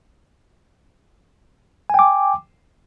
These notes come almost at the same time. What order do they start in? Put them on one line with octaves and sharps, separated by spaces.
G#5 G5 D6